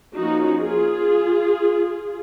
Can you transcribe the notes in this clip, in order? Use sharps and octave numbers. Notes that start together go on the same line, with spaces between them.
F3 A#3 C#4 D#4 F#4
F4 G#4